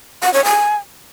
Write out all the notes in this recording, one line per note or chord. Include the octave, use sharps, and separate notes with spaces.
F#5
C#5
G#5